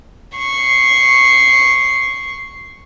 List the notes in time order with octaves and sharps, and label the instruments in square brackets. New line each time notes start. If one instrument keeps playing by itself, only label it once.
[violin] C#6 C7